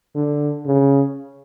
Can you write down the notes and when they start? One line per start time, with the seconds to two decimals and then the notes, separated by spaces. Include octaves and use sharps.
0.15 D3
0.66 C#3